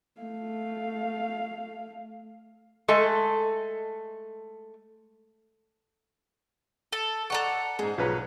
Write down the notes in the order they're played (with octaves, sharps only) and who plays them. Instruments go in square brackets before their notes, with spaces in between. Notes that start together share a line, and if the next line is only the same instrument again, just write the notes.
[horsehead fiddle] A3 F5
[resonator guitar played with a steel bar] G#3 A3 A4 G#5
[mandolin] A4
[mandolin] A4 A#5 C#6 [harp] D5 F#5
[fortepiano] G#2 G#3 [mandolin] G#4 [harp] C7
[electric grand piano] B1 B4 A#5 [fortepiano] F3 G#3 C#5 [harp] G#6